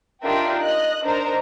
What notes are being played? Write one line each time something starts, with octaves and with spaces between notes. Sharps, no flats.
D4 D#4 F4 G4 A#4 E5
D#5 F#6
D4 D#4 A#4 C5 A#5